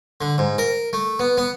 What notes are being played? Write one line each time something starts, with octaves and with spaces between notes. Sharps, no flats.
D3
G#2
A#4
A3
B3
B3